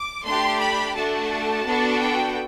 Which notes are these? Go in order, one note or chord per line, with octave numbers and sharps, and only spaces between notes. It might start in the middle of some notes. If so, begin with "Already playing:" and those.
Already playing: D6
A3 D4 G4 C6
B5
A3 D4 F#4 A5
B3 D4 F#4 A4
G5